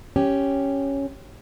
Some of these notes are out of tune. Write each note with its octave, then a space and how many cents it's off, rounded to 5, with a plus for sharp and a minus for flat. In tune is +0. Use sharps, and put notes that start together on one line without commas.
C#4 +0 G4 +0